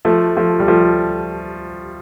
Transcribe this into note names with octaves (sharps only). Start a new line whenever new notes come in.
F3 A3
F3 A3
G3
F3 A3